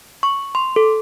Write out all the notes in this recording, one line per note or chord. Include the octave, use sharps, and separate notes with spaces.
C#6
C6
A4